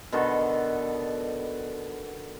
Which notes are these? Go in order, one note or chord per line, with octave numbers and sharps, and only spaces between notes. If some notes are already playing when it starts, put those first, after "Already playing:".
B2 D3 D#3 A4